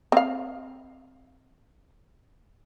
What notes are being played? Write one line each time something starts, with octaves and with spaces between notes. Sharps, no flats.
C4 F5